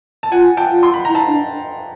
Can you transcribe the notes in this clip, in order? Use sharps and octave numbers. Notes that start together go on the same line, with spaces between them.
A5
F4 F#5 G#5
G5 A5
F4
C6
B5
E4 A#5
A5 B5
D4